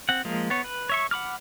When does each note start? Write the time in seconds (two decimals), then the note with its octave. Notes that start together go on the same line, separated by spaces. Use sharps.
0.09 C4 F#5
0.25 F3 G#3 A#3
0.50 B3 C#5
0.64 B4
0.89 C#5 E5 C#6
1.11 F#5 B5 D6 F6